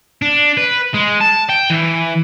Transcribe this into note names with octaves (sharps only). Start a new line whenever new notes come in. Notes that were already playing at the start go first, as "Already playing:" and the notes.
D4
B4
G#3
A5
G5
E3